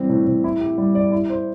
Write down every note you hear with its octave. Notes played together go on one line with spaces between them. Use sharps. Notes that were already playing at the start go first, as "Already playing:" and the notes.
Already playing: E3 G3 C4
A2
A2
E4
G4
G3
D5
E4
C5